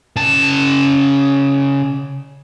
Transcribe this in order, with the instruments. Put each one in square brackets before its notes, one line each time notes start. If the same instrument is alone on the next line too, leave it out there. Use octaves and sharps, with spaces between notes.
[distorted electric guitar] C#3 A5